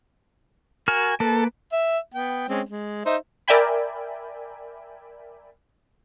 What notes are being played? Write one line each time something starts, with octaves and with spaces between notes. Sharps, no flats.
F#4 A#4 G#5 F6
A#3 A4 B4
E5
B3 G5
G#3 C4 C#4
G#3
D#4 C5 E5
A#4 D5 E5 G5 G#5 B5